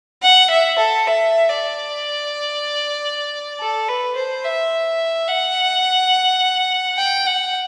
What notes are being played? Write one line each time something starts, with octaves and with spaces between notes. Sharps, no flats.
F#5
E5
A4
E5
D5
A4
B4
C5
E5
F#5
G5
F#5